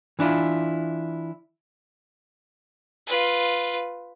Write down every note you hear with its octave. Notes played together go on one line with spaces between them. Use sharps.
E3 D4 E4 F4
F4 B4